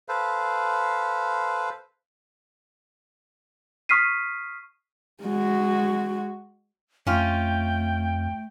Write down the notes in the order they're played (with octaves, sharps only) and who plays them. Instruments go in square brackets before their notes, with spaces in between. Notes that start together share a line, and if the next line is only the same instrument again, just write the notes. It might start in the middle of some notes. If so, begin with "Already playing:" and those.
[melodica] A4 B4 C5 F5
[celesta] C#6 D#6 F6 B6 C7 D#7
[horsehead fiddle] G#3 F#4
[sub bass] F2 [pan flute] A3 [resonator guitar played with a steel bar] C#4 F4 [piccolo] G5